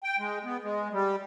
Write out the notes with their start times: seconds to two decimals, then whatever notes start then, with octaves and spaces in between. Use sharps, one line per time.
0.03 G5
0.19 G#3
0.45 B3
0.64 G#3
0.93 G3